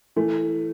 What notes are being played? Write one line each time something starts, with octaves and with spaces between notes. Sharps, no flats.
E3 A3